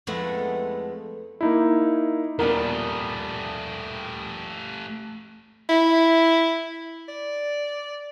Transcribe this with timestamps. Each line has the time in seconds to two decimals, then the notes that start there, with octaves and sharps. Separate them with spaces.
0.07 F2 G#3 A3 B3 E4 F#5
1.41 A#3 D#4 E4
2.39 D#1 A3 B3 D4 G4 A#4
5.69 E4
7.08 D5